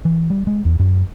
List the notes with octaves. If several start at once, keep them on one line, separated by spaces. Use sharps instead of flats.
E3
G3
G#3
E2
F#2